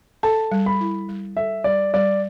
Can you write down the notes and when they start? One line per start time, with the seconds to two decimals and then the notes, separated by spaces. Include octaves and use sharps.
0.23 A4 A5
0.52 G3
0.66 B5
0.80 E4
1.09 G3
1.37 A4 E5
1.64 G3 D5
1.94 G3 D5